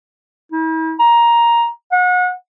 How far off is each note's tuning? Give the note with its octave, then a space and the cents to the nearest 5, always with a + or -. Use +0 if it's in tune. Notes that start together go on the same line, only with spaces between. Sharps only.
E4 -45
A#5 +10
F#5 -35